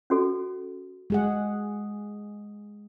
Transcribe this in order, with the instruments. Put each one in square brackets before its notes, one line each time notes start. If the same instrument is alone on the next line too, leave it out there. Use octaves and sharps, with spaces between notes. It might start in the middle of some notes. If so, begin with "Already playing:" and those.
[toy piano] C#4 F#4 A4
[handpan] G#3 G#4 F#5